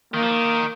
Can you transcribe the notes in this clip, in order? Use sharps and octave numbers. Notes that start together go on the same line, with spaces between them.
D#3 A#3
F3
D#3